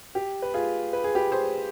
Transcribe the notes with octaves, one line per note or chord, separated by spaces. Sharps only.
G4
B4
F4 G#4
B4
G#4
G4 B4
G#4 C5